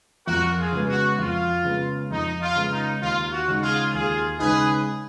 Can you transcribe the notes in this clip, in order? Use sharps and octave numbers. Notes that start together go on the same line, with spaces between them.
F2 F#4 A#4
F4 G#4
C#3 G#3 B3
F#4
F2 F4
C#3 G#3 B3
F2 D#4
F4
C#3 G#3 B3
D#4
D#2 F4
F#4
C#3 G#3 D#4
F4 G#4
D#2 F4 G#4
C#3 G#3 D#4 G#4 B4